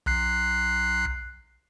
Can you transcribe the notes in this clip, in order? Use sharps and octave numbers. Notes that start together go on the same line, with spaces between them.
B1 F#6 C7